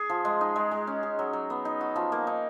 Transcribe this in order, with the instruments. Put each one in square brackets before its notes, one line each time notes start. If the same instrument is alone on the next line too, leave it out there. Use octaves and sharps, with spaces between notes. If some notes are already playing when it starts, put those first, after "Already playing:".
Already playing: [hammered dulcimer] G#4
F3
G#3
D#4
G#3
G#3
C#4
G#4
F#3
F#3
B3
D#4
F#4
F3
A#3
D#4